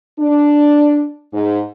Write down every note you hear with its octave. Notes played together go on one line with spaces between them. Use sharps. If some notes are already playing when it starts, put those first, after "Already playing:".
D4
G#2